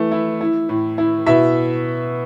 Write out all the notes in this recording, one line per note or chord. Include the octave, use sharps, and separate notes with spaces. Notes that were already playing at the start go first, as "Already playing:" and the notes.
Already playing: E3 A3
E4
E4
A2
E4
B2 E4 E5